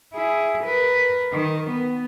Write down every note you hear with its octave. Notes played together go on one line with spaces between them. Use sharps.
E4 G#4
A#4 B4
D#3
B3